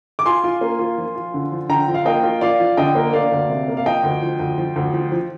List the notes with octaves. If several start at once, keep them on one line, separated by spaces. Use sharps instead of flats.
D6
F4 G#5 C6
F4
A#3
F4
F3
F4
D3
F3
D3 G5 A#5
F3
F5
A#3 D#5 G5
F4
F4 D5 F5
F3
D3 D#5 G5
A#3
A#3 D5 F5
D2
C3
A#3
F5
F3 D#5 G5
D2
F3
D2
F3
D2
F3
F3